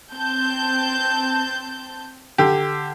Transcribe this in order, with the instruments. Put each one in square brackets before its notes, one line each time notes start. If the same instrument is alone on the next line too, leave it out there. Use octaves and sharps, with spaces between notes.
[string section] C4 A5 G6
[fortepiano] D3 G4